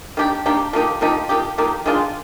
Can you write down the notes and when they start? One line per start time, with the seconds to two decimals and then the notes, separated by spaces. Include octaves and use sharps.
0.17 D#3 A#3 D4 G4
0.46 D#3 A#3 D4 G4
0.73 F3 A#3 D#4 G4
1.01 F3 A#3 D#4 G4
1.29 F3 A#3 D#4 G4
1.58 F3 A#3 D#4 G4
1.86 D#3 G#3 D4 F4